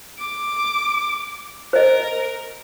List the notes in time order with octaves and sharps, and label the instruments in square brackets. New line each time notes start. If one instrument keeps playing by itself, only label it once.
[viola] D6
[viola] A#4 [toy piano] C5 D#5